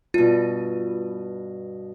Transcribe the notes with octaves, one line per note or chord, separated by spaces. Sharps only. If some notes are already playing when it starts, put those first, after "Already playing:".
G2 B2 F4